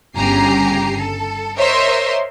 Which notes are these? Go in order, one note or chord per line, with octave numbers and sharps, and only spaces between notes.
G1 C#3 G4 G#5 A#5 C7
A4
A#4 C5 C#5 D#5 E5 C6